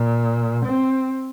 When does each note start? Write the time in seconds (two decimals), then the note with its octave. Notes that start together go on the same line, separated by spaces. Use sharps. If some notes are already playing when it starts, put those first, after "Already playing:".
Already playing: A#2
0.65 C4